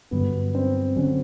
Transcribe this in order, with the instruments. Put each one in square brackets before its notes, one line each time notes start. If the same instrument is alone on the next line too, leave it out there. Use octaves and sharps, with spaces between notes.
[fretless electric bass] G2 D3 F#3 [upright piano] B3
[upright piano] C4
[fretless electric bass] D3 F#3 [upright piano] C#4